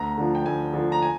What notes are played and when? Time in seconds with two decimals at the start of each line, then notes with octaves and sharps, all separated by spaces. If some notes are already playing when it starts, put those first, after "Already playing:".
Already playing: D2 A#5
0.18 D3 F3
0.35 G5
0.46 D2 G#5
0.73 D3 F3
0.92 A#5
1.02 G#5